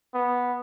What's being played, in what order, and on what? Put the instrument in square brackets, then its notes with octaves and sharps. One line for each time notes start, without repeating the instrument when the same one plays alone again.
[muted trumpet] B3